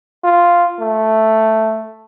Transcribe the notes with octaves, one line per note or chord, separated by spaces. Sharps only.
F4
A3